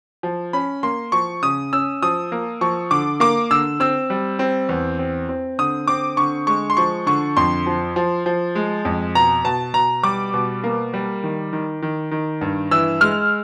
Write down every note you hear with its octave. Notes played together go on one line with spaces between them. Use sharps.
F3
C#4 B5
A#3 C6
F3 C#6
C#3 D#6
C#4 E6
F3 D#6
A#3
F3 C#6
D3 D6
A#3 D6
D3 E6
C4 E6
G3
C4
E2
C4
C4
D3 D#6
C4 D6
D3 C#6
G#3 C#6
C6
F3 C#6
D3 C#6
F2 C6
F3
F3
F3
G#3
F2
B2 A#5
B2 A5
B2 A#5
G3 D6
B2
A#3
G3
D#3
D#3
D#3
D#3
G2
E3 E6
G#3 F6